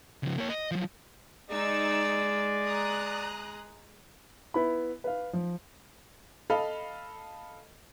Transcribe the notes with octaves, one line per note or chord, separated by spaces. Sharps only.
C#3 F3
A#3 C#5
D#5
F3 F#3
G#3 D#4 D5 E6
A#5 D#6 F#6
B3 E4 B5
B4 F5
F3
A4 D#5 F5 B5